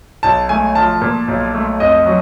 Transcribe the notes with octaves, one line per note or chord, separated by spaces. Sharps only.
B1 A5
A3 G#5
F3 A5
A#2
B1
A3
F2 D#5
F#3